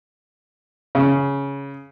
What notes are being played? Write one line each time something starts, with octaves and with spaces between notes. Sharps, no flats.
C#3